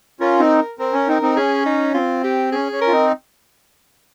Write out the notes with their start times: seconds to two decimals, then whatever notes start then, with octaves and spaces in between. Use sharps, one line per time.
0.20 C#4 F4 A#4
0.40 C4 D#4
0.79 C4 A#4
0.93 C#4
1.08 C4 D#4
1.22 C4 D#4
1.36 C#4 G#4
1.66 D#4
1.94 C4 F4
2.24 G4
2.52 C#4 G#4
2.72 C#4
2.81 A#4
2.87 F4
2.92 C4 D#4